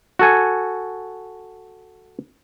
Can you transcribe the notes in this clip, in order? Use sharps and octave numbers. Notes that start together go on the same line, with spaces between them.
F#4 A4 G#5